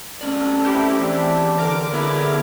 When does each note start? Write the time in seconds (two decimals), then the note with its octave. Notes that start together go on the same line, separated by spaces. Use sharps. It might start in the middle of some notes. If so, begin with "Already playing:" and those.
0.21 A3 C#4 A4 D5
0.65 C4 E4 G4
0.99 E2 D4
1.57 D3 A#4 D6
1.93 B3 E4 G#4 C#5